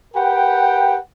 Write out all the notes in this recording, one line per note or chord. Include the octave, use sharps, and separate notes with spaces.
G4 A#4 B4 F#5 G5